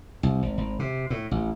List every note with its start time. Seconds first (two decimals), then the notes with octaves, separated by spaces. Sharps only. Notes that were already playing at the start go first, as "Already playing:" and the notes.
0.23 C2
0.43 G#1
0.58 G#1
0.79 C3
1.10 A2
1.31 A1